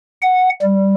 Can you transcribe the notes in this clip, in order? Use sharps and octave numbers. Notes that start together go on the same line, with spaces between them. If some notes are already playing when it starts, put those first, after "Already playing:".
F#5
G3